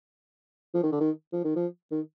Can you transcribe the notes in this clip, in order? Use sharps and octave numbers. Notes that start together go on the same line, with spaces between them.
F3
D#3
D3
D#3
F3
D#3
F3
D#3